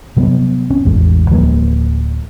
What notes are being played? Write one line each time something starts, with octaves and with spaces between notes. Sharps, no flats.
C3 F#3 G3 B3
C#4
A1 E2 G#3
D1 F3 G3 A#3